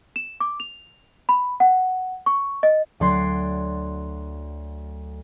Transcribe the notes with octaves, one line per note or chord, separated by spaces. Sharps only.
E7
D6
F7
B5
F#5
C#6
D#5
D2 F#3 D5 C6 G#6 C7